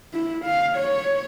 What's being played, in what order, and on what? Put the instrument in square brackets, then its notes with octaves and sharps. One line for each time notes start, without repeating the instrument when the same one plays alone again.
[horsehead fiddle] E4
F5
C#5